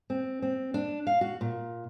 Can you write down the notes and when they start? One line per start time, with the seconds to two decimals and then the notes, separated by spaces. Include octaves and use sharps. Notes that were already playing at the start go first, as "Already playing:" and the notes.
0.10 C4
0.42 C4
0.74 D4
1.07 F5
1.21 F#4
1.41 A#2